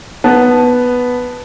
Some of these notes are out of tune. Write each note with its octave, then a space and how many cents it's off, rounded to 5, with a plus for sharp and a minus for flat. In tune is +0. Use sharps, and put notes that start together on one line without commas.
B3 +0 A5 -5